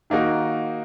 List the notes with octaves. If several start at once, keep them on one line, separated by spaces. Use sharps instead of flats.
D#3 A#3 D#4 F#4